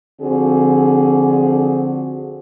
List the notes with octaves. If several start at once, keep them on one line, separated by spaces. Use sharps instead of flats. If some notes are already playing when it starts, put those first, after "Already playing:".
D3 F3 C4 F#4 G#4